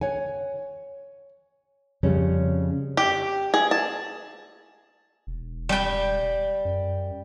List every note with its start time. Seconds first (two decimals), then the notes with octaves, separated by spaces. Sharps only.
0.01 C#5 F#5 G#5
2.03 F2 C#3 G3 C#4
2.97 G4
3.54 G#4
3.71 A5
5.27 E1
5.69 G3 G5
6.65 F#2